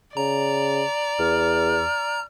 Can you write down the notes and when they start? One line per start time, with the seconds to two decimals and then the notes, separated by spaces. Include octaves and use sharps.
0.17 C#3 D5 A#5
1.19 E2 F6